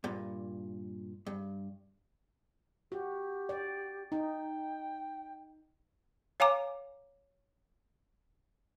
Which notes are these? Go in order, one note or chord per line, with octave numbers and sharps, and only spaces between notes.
G2 A#2
G2
F#4 G4
D5
D#4 G5
C#5 F5 G#5 A#5 D6